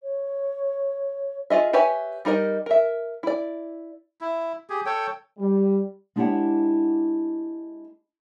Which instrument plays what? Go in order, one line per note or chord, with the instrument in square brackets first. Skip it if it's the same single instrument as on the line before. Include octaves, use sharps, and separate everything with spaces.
[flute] C#5
[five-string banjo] F4 G#4 D#5 E5
G4 B4 C#5 E5 G#5
G3 D#4 A#4 D5 D#5
A#4 E5
E4 D5
[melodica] E4
G4 G#4
A4 C#5 G5
[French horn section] G3
[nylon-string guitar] G#3 D4 E4 G4 C#5 F#5